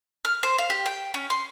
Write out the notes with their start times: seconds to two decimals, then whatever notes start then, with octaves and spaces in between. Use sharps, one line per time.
0.25 F6
0.43 C5
0.58 F5
0.70 G4
0.86 G5
1.14 C#4
1.30 C6